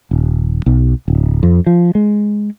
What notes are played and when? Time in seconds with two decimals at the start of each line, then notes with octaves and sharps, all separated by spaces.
0.11 D#1
0.66 B1
1.08 D1
1.43 F2
1.66 F3
1.95 G#3